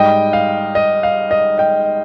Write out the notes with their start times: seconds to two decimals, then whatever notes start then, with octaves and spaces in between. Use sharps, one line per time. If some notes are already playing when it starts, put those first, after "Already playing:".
Already playing: G#2 G3 D#5 G5
0.33 F5
0.75 D#5
1.03 F5
1.31 D#5
1.58 D#5 G5